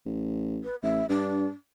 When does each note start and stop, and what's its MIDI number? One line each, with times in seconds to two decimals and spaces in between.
0.06 0.62 33
0.64 0.76 71
0.83 1.03 33
0.83 1.05 76
1.09 1.47 43
1.09 1.48 62